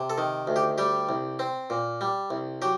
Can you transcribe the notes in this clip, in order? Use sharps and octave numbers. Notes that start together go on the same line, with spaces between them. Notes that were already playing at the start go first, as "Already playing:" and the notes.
Already playing: C3
A4
D#3
D2
G4
G3 G4
C2
C4
A#2
G3
C2
F#3 G4